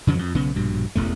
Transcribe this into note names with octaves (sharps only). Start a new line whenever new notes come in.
F2 C#3 E3 F#3
F2
B1 C#3 B3
A#1 G2 B2
E1 A1 E2 A3